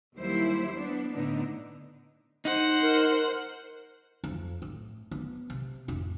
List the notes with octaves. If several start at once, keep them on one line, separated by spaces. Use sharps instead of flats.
D#2 F#3 G3 E4 C5
B3 D4
A2 D3 B3 D4 D#4
D#4 C5 F#5
A#4
F2
A2
B3
C3
F1 A2